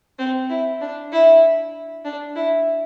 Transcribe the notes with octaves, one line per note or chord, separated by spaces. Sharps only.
C4
E4
D4
E4
D4
E4